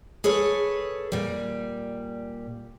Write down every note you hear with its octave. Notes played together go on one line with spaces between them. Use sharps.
G#4 A4 B4 C#5
A#2 G3